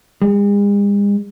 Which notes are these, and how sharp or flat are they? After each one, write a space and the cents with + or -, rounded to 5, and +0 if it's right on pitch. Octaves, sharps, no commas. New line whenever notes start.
G#3 -45